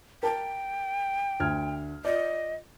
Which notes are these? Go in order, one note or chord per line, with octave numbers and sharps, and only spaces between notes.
A#4 G5 A5
D2 F6 G#6
F4 D5 D#5